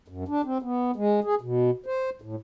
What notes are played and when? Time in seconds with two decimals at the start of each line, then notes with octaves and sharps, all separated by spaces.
0.08 F#2
0.28 D4
0.45 C4
0.62 B3
0.96 G#3
1.24 G#4
1.41 B2
1.86 C5
2.22 A2